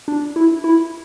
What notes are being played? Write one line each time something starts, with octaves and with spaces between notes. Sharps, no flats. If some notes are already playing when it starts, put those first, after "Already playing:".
D4
E4
E4